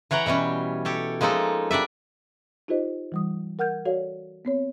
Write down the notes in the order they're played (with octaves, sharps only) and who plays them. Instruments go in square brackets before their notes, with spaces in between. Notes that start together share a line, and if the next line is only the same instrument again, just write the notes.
[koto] E3 C#5 F#5 G5 A#5
B2 E3 G3 C#4
G4 A4 C#5
F3 G#3 A#3 D#4 A4
G3 D4 D5 E5
[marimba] D#4 F4 G4 A4 C5 D#5
E3 G3 D#6
A#4 F#5 F6 G6 G#6
F#4 A4 C#5 D5 F5
B3 C4 C#5